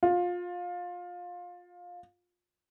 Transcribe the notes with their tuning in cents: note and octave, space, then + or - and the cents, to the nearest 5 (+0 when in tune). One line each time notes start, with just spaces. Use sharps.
F4 +20